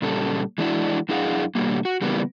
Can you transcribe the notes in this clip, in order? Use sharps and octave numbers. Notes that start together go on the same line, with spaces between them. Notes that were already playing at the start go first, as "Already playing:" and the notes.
A#2 C#3 G3 A4
E3 G#3 D4 E4 F#4
F#2 D4 E4 G#4 F5 F#5
B2 D3 D#3 G3 A#3
F#4
C#3 E3 G3 A#3 B3